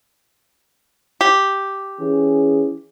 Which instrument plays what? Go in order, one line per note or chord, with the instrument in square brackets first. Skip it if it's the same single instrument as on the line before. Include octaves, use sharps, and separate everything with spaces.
[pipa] G4
[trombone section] E3 C#4 G#4